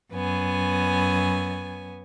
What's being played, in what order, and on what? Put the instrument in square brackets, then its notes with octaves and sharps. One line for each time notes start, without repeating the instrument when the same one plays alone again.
[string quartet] F#2 B3 G#5